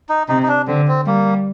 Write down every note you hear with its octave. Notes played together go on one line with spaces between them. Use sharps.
D#4
C3 D#4
D#4
D4
D3 C4
C4
G3 A#3